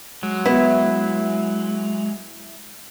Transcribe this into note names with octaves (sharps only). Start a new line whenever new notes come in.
F#3 G#3
B3 E4